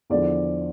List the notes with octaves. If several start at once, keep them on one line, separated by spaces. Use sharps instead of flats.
E2 D3 F3 D5